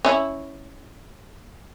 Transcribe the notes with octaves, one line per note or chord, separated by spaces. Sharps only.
C#4 E4